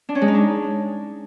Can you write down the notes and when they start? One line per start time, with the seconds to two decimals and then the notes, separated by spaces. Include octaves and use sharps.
0.09 D4
0.15 C#4
0.22 G#3
0.28 D#4
0.34 D4